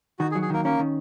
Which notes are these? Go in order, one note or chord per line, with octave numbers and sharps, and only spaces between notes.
D#3 F#4
G#4
F#3
G#4
D#3 A#3 A#4
A#3 C#4 A#4
D#3